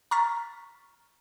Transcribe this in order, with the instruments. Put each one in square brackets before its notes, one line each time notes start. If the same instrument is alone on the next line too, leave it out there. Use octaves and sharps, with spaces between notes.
[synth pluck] A#5 C#6 F6 A6 B6